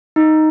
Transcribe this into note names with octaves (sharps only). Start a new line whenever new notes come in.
D#4